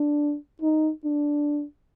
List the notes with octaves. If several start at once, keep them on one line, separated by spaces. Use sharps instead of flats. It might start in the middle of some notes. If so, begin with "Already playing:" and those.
Already playing: D4
D#4
D4